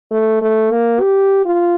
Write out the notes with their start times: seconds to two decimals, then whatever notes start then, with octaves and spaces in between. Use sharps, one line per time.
0.11 A3
0.42 A3
0.71 A#3
1.01 G4
1.45 F4